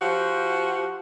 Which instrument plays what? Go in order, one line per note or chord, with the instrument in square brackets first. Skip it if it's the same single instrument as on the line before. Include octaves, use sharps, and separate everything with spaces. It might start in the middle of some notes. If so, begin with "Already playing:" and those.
[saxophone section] F3 F#4 G4